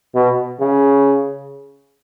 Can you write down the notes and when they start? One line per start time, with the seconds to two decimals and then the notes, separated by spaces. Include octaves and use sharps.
0.15 B2
0.60 C#3